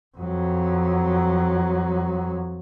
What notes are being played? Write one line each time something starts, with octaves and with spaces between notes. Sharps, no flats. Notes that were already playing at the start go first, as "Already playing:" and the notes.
F2 F#3